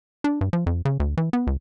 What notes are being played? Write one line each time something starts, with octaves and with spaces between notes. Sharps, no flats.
D4
G2
F3
F2
C#3
D2
E3
B3
C#2